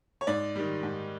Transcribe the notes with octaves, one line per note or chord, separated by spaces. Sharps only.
C#5
G#2 D5
D#3 G3
G#2